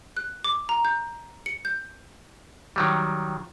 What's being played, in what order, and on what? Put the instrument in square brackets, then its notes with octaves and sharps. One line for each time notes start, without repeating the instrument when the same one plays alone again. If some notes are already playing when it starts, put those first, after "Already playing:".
[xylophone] F#6
D6
A#5
G6
C#7
G6
[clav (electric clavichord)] D#3 F#3 G3